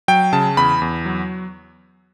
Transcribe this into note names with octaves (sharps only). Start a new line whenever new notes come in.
F#3 G5
C#3 A5
E2 B5
E2
F#3